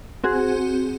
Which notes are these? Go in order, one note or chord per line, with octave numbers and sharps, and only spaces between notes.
C4 F#4 G#4